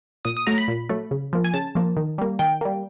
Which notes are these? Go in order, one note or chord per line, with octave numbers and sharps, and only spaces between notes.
A#2 D#6
D#6
F#3 A3 A#5
B5
A#2
F#3 A3
C#3
F3 A#3
G#5
C#3 A5
F3 A#3
D#3
G3 A#3
D#3 G5
G3 A#3